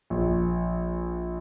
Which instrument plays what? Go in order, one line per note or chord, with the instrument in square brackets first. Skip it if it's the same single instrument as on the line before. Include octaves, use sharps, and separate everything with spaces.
[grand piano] A#1